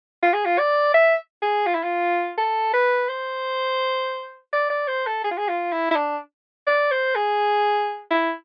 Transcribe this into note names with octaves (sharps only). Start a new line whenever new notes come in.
F4
G#4
F4
D5
E5
G#4
F4
E4
F4
A4
B4
C5
D5
D5
C5
A4
G#4
F4
G#4
F4
E4
E4
D4
D5
C5
G#4
E4